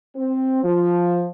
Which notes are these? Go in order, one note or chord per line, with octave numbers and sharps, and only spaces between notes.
C4
F3